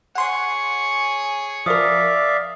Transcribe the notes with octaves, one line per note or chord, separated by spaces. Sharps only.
G#4 C#5 F#5 C6
F3 A#4 D5 E5 F5 D#6